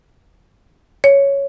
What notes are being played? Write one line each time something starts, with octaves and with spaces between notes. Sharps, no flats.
C#5